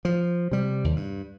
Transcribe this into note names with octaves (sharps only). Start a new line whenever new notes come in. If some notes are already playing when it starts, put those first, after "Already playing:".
F3
C3 G3
D#2
G2